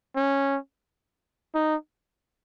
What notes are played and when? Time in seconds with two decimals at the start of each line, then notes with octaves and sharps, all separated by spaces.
0.16 C#4
1.55 D#4